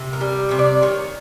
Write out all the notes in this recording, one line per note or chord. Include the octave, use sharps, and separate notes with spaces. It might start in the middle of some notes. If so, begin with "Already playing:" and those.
Already playing: C3
A#4
G3
C3 C#5
D5
D#3 C#5